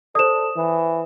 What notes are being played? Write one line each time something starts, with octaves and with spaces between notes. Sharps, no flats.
A4 C5 D5 D#6 E7
E3